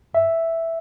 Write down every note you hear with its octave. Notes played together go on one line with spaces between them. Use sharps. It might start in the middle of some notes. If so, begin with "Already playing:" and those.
G2 E5